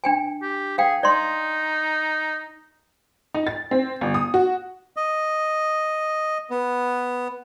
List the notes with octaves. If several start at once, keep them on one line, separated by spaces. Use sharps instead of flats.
D4 G5 G#5
G4
G#4 F5 G5
D#4 D5 C6
D#4
A6
C4
G1
D#6
F#4
D#5
B3